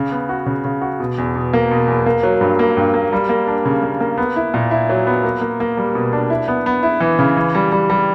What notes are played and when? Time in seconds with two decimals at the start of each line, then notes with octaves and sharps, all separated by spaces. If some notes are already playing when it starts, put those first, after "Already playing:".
Already playing: C#3
0.12 B3
0.29 F#4
0.46 C#3
0.64 C#3
0.82 F#4
1.00 B2
1.18 E2
1.35 B2
1.53 A#3
1.71 B2
1.88 E2
2.06 A#3
2.23 F#3
2.41 G2
2.59 A#3
2.77 G2
2.94 A#3
3.13 G3
3.29 A#3
3.47 D4
3.65 C#3
3.83 A#3
4.00 A#3
4.18 B3
4.36 E4
4.54 A#2
4.71 E4
4.89 F#3
5.07 B3
5.24 A#3
5.41 A#3
5.60 A#3
5.77 G3
5.95 B2
6.13 D4
6.30 E4
6.48 B3
6.66 B3
6.83 E4
7.01 E3
7.19 C#3
7.37 E3
7.55 G3
7.72 G3
7.90 G3